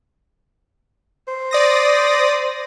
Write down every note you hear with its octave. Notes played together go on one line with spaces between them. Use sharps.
C5
D5 D#6 A#6